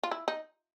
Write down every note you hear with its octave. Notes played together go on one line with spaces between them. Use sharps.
F4
E4
D#4